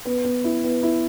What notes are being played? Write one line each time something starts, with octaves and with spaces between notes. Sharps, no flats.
B3
B3
E4
B3
E4